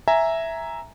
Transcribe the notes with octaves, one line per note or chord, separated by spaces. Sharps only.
E5 G#5 A#5